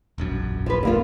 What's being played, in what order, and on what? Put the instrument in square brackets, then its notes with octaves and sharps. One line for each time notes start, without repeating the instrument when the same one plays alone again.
[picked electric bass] E1 A#1 F#2
[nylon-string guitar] F3 B4
D3 A#3 F4